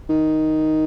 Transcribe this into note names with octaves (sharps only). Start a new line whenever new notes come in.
D#3